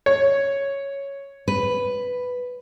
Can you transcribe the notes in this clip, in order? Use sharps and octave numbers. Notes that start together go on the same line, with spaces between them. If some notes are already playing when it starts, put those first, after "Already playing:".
C#5
B4